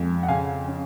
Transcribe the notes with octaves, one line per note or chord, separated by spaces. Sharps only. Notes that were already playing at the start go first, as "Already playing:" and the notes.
Already playing: F2 G#3
F#5
C#3 F5 G#5
C#4